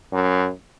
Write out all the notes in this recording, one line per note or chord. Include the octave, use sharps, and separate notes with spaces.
F#2